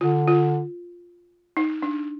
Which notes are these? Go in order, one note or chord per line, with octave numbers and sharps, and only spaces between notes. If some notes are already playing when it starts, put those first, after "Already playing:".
D3 F4
F4
D#4
D4